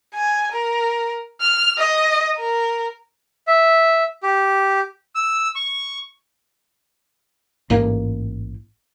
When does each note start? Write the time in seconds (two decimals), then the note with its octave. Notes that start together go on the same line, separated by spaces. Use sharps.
0.15 G#5
0.52 A#4
1.41 F6
1.78 D#5
2.38 A#4
3.47 E5
4.23 G4
5.15 E6
5.55 C#6
7.70 A1 G#2 A#3